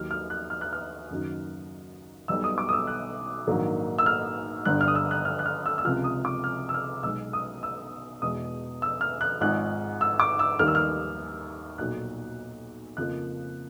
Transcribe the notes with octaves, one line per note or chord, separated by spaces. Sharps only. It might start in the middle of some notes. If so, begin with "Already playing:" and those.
Already playing: D#2 D#3 F#3 F6
F6
F#6
F6
F#6
F6
F#1 F#2 D#3 F#3
B1 B2 G3 E6
D#6
D6
D#6
E6
F#6
A#1 G#2 D#3 F#3 A#3
E6
F6
G1 G2 D3 F#6
F6
D#6
E6
F#6
F6
F#6
F6
E6
E6
C#2 C3 F3 F6
D#6
D6
F6
E6
F6
B1 B2 G#3 E6
D#6
E6
E2 B2 G#3 D#6
E6
F6
F#6
G#1 G#2 F3 G#3 F#6
E6
D6
E6
D#2 D#3 G3 A#3 F6
E6
F6
B1 A#2 F#3 F#6
F2 C#3 F3 A#3 F#6